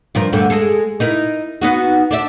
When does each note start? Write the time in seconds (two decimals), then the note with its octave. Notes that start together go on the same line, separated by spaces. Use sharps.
0.15 G2 F3 A#4
0.32 D2 G2 D3
0.50 G#3 G#4 A4
1.00 D#4 E4 A#4
1.61 B3 D#4 F#4
2.11 D4 D5 E5